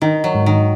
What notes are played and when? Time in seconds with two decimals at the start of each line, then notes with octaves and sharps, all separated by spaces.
0.02 D#3 D#4
0.24 F#3
0.35 G#2
0.46 D#3